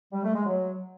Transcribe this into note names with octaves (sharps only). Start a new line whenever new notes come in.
G3
A3
G#3
F#3